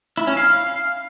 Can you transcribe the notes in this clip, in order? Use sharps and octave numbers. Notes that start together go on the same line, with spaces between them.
E4
C#4
F5